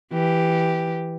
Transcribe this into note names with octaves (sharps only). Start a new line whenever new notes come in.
E3 G4